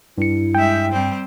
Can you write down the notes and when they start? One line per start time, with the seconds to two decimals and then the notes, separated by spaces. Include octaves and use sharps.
0.18 G2 E4 C#7
0.55 G#3 E5 G5
0.92 G3 C4